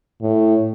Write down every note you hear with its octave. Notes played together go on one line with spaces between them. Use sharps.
A2